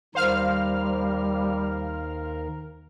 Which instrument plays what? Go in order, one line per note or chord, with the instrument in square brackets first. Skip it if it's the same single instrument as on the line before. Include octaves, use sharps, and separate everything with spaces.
[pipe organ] D#2 D#3 A#4 [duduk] G3 [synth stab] C5 F5 F6